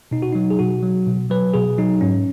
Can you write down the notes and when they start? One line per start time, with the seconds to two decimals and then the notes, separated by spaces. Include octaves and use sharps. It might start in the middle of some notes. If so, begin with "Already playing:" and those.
0.11 B2 D#4
0.22 F#4
0.32 F#3 D#4
0.50 G#4
0.59 B2 F#4
0.83 F#3
1.07 B2
1.30 F#3 B4
1.54 B2 G#4
1.78 F#3 D#4
2.01 G#2 C#4